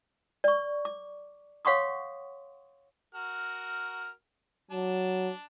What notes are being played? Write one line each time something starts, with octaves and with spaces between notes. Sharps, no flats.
D5 C#6
D6
C#5 F5 F#5 C6 C#6 D#6
F#4 A#4 F6
F#3 D4 A5